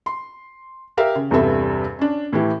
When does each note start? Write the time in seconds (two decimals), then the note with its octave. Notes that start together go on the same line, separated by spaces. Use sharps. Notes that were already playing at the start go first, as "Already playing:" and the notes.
0.06 C6
0.97 G4 A#4 E5 F5
1.16 C#3
1.31 E2 G2 C3 G3 A4 E5
1.99 C#4 D4
2.33 A2 E3 E4 G4